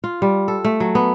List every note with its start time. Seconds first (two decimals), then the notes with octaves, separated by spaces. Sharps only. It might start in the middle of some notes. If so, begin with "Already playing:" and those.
0.04 F4
0.22 G3
0.48 A4
0.65 A3
0.80 F#3
0.95 B3